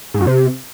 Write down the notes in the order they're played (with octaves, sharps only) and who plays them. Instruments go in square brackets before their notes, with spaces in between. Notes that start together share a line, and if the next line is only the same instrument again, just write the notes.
[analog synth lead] G#2
F#2
C3